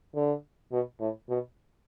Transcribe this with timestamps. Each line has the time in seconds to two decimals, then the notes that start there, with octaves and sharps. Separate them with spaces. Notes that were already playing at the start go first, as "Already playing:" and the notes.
0.16 D3
0.72 B2
1.00 A2
1.29 B2